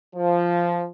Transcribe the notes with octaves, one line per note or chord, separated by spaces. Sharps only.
F3